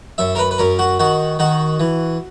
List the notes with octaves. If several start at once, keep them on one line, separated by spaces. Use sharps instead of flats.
F#2 E5
A#4
B4
B4
F#2 A#4
F#4
D#3 F#4
D#3 F#4
E3